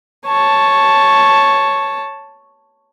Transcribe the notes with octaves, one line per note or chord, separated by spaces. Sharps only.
C#5 A5